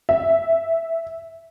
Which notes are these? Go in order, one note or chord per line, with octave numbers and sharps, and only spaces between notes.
E5